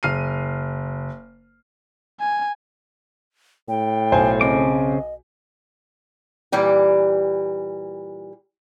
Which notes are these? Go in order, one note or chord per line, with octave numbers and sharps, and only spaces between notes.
F#1 F6 C7 D#7
G#5
A2 G5
B1 C5 G#5
C#3 C4 D#5 D6
A#2 E3 G3 G4